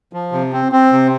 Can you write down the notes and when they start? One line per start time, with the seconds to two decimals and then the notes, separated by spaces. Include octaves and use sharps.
0.13 F3
0.32 C3
0.53 C4
0.72 C4
0.92 C3